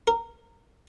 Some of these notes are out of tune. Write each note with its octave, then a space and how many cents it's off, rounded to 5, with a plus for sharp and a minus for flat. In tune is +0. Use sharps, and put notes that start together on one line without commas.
A#4 -15